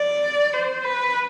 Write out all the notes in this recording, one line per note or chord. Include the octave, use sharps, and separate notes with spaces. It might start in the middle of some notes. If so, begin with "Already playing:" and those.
Already playing: D5
C5
B4